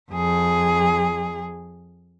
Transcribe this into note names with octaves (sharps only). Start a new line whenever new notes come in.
F2 G#4